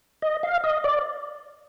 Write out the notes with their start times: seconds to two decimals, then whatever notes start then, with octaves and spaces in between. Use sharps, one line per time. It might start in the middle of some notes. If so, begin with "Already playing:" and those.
0.22 D#5
0.43 F5
0.64 D#5
0.84 D5